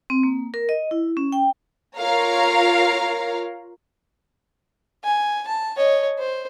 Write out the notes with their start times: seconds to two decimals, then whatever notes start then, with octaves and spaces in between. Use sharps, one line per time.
0.10 C4
0.23 A#3
0.54 A#4
0.69 D#5
0.91 E4
1.17 C#4
1.32 G5
1.99 F4 A#4 C#5 F5 A#5
5.04 G#5
5.47 A5
5.77 C#5 D#5
6.19 C5